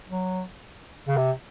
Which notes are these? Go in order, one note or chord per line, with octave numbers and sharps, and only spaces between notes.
F#3
C#3
C3